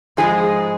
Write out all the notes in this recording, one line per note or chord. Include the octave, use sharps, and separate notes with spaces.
G#2 F3 G#3 G#4